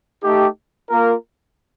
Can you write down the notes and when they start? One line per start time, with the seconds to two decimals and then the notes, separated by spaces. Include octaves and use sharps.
0.23 A3 D#4 G4
0.90 A#3 F4 A#4